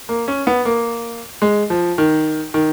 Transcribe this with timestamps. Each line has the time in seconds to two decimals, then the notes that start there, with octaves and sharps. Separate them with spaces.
0.09 A#3
0.28 C#4
0.47 B3
0.65 A#3
1.42 G#3
1.70 F3
1.98 D#3
2.54 D#3